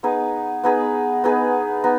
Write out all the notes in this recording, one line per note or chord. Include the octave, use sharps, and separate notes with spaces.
B3 D#4 G#4 B4
B3 D#4 G#4 B4
B3 D#4 G#4 B4
B3 D#4